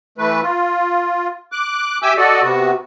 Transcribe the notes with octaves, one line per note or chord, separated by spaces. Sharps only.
E3 A3 B4
F4
D6 F#6
G4 E5 G#5 D6 E6 G6
F#4 A4 D5 D#5
C3 B3 F#4